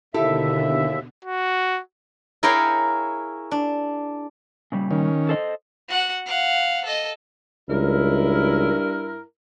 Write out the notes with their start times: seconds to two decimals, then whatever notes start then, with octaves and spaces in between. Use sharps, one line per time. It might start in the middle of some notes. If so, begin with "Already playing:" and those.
0.14 D#2 B2 D3 E4 G4 A4 E5
1.25 F#4
2.43 E4 G#4 A#4 C#5 F5 G5
3.51 D4
4.72 A#2 C#3 G3
4.91 D#3 C#4
5.29 A4 C5 D#5
5.88 F#4 F#5
6.26 F5 F#5
6.85 A4 D#5
7.69 C#2 G2 E4 A#4